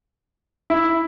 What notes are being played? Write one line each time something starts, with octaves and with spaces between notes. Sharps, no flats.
E4